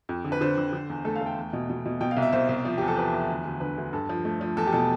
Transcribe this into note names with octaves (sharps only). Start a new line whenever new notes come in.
F2
D3
B4
D3 C5
D3
D3
E2
A3 A4
F5
A3
G5
E2
B2
B2
B2
B2 G5
F5
C2
E5
C2 C5
C2
F3
E2 G4
A4
F3 B4
E2
D2
D2
D3 B4
D2
G2 A4
F3
A3
F3
E2 A4
G4
B2 A4